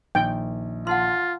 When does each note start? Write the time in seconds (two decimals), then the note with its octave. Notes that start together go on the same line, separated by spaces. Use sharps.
0.15 A#1 D#3 G5
0.87 F4 F#5 A5 C6